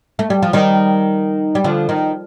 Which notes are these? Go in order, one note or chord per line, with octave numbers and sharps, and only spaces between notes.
A3
G3
F3
D#3 G3
G3
D3 F3
D#3